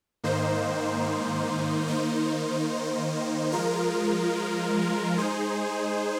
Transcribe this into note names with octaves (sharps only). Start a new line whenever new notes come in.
G#2 D#3 A#3 D#4 C5
D#3 A#3 D#4 C5
F3 G#3 F4 A#4
G#3 D#4 G#4 C5